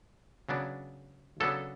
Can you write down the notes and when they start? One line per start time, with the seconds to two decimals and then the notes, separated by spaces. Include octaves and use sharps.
0.49 C#3 F#3 B3 D4
1.40 C#3 F#3 B3 D4 A4